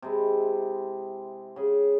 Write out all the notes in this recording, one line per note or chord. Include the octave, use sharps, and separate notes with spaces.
C3 G#3 E4
C#3 G#4